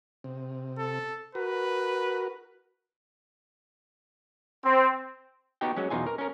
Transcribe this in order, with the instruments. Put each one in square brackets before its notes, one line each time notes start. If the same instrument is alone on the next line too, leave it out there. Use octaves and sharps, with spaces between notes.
[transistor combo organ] C3
[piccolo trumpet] A4
[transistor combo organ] F#4 A#4 [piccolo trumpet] B4
[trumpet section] C4
[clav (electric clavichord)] B3 D#4 F#4 G4 G5
F#3 G#3 C#4
E2 B2 D#4 F4 G#5
A#4
C#4 A#4